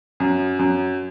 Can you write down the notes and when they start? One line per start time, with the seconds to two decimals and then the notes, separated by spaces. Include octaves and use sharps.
0.20 F#2
0.59 F#2